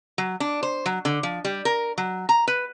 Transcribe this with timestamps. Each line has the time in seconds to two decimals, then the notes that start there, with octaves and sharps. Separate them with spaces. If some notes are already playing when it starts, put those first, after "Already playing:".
0.18 F#3
0.40 D4
0.63 C5
0.86 F#3
1.05 D3
1.23 F3
1.45 G3
1.65 A#4
1.98 F#3
2.29 A#5
2.48 B4